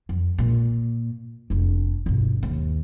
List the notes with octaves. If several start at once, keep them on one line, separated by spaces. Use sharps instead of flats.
F2
A#2
F1 D4
G1 B2
D#2